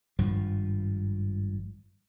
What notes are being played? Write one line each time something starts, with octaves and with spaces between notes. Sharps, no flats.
G#1 G2 F3